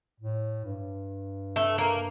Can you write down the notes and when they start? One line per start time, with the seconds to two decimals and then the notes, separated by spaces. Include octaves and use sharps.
0.20 A2
0.65 G2
1.56 A3
1.78 A#3